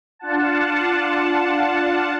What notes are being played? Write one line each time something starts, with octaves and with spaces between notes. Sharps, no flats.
D4 F4 F#5 A5